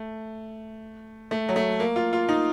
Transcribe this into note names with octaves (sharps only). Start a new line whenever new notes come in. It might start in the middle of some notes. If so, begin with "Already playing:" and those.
Already playing: A3
A3
F#3
A3
A#3
F4
F4
D#4